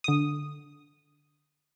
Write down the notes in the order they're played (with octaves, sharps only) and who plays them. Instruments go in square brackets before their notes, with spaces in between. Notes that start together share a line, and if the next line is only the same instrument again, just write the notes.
[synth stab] D3 D#6